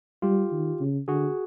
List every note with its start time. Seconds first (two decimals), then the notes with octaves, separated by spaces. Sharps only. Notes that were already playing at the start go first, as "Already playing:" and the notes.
0.22 G3 F4 G4
0.52 D#3
0.80 C#3
1.08 D3 F#4 G#4